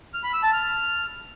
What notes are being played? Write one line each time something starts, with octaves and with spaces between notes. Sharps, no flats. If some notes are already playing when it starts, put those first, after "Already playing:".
F6
B5
E6
A5
F6